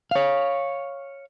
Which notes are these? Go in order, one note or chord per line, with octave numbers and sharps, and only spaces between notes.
C#5 F5